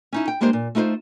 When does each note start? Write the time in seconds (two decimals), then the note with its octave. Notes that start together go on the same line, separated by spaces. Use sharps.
0.13 C#4 D#4 E4
0.28 G5
0.41 G3 G#3 A#3 D4 G4 C5
0.53 A#2
0.75 A3 D#4 F4 B4 C5